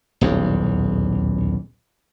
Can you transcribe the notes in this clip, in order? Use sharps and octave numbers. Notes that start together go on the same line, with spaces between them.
D#1 B1 E2